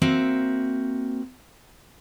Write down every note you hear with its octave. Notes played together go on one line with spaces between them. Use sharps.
A#3 C4 F#4 E5